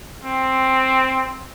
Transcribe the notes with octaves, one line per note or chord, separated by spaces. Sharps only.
C4